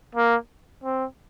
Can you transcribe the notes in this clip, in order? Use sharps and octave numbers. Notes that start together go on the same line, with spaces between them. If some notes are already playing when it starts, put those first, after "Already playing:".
A#3
C4